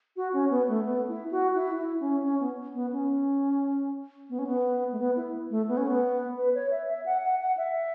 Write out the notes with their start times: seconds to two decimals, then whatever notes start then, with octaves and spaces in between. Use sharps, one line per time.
0.16 F#4
0.33 C#4
0.50 B3
0.69 A3
0.85 B3
1.08 E4
1.31 F#4
1.55 E4
1.78 E4
2.00 C#4
2.23 C#4
2.40 B3
2.75 B3
2.93 C#4
4.30 B3
4.39 C#4
4.47 B3
4.92 A3
4.99 B3
5.16 E4
5.50 A3
5.68 B3
5.77 C#4
5.87 B3
6.38 B4
6.55 C#5
6.71 E5
6.89 E5
7.06 F#5
7.23 F#5
7.40 F#5
7.57 E5